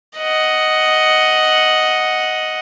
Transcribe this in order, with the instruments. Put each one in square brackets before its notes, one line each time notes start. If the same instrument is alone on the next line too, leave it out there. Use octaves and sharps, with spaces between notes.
[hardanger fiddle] D#5 F#5